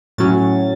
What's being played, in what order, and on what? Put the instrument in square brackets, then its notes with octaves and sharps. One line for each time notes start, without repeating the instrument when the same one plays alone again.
[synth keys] A2 F#3 C#4 A6